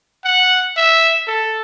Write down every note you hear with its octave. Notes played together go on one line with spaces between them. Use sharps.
F#5
E5
A4